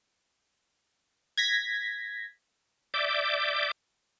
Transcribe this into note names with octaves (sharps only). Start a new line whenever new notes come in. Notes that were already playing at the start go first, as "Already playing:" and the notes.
G#6 A#6 B6
D5 E5 D6 G6